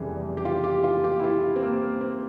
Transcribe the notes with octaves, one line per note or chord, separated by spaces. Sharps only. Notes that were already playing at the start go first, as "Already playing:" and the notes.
Already playing: F1 F2 C#3 E3 G3 G#4
G4
F4
G4
F4
G4
E4
F4
C4
A#3
C4